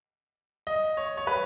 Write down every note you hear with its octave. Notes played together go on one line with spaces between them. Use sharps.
D#5
C#5
C#5
B4